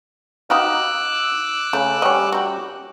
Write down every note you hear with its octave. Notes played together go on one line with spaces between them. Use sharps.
D#4 F#4 G4 F5 D6 E6 F#6
C#3 A3
G3 C#4 C#5 D#5 F#5
F#4 G4